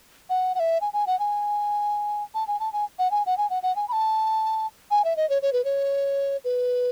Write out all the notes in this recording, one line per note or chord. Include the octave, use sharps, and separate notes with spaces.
F#5
F#5
E5
G#5
G#5
F#5
G#5
A5
G#5
A5
G#5
F#5
G#5
F#5
G#5
F#5
F#5
G#5
B5
A5
G#5
E5
D#5
C#5
C#5
B4
C#5
B4